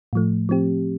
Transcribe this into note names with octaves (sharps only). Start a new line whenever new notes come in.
A2 F3 A3
F3 C4 G4